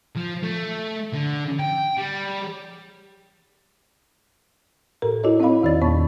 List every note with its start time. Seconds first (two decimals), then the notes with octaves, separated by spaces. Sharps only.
0.16 F3
0.43 A3
1.13 D3
1.60 G5
1.98 G3
5.02 A2 A4 A#4
5.23 E4 F#4 A4 C#5 D#5
5.40 C4 D#4 C#5 D#5 F5 B5
5.63 E2 D#3 D5 D#5 A6
5.82 E2 A#2 B3 C#5 B5 C#6